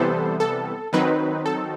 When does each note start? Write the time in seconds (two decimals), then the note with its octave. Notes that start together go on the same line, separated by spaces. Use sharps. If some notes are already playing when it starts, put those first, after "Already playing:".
Already playing: C3 E3 G3 B3 A4 C5
0.40 A4
0.93 D#3 F#3 C4 D#4 B4
1.46 A4